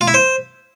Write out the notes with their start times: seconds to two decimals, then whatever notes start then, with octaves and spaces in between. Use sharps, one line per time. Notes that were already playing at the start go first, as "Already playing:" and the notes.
0.01 F4
0.08 E4
0.14 C5